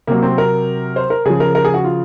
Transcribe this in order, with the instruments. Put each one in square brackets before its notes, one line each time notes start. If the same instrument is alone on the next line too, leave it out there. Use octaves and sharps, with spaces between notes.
[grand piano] C3 F#3 A#3
C4
A#4
C5
A#4
C#3 F3 G#4
A#4
A#4
G#4
F#4
F4